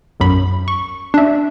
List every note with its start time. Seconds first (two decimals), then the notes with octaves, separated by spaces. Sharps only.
0.20 B1 F#2 B5
0.68 C#6
1.14 D4 E5